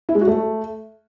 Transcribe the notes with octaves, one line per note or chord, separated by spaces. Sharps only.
E4
G#3
F#4
A3